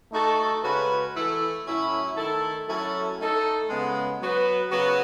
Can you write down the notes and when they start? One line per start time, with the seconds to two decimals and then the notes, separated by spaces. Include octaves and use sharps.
0.12 A3 D#4 F#4 A4
0.63 C#3 G#3 C#4 F#4 B4
1.15 E3 A3 E4 A4
1.65 A2 F#3 C#4 E4
2.16 D#3 A3 E4 A4
2.67 F#3 A3 C#4 E4 A4
3.19 A3 D#4 A4
3.69 C#3 G#3 B3
4.20 F#3 B3 F#4 B4
4.71 C#3 F#3 B3 F#4 B4